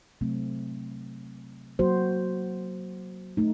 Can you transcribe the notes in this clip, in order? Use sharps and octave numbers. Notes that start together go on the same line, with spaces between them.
C3 F#3 A3 C4
F#3 A#3 F#4 C5
A3 D#4